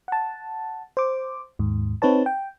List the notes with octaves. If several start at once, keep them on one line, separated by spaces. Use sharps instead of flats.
F#5 A5
C5 D6
D#2 G#2
C4 D#4 B4 C#5 A5
G5